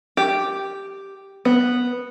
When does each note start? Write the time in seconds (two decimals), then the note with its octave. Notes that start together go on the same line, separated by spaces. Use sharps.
0.17 G4
1.45 B3